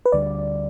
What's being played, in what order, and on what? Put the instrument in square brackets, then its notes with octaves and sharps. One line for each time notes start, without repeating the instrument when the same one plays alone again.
[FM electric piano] B4
[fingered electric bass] D2 D3 G3 [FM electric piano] D5